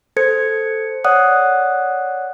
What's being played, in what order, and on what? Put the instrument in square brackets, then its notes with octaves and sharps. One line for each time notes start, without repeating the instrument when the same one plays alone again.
[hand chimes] A4 C5 G#6 C#7
C#5 D5 F#5 D#6 F#6